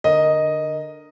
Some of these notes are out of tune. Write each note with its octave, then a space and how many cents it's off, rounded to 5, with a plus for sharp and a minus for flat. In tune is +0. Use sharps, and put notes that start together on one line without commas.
D3 +15 A#4 +0 D#5 +0